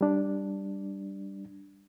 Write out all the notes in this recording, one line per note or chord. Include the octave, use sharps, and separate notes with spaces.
G3 D4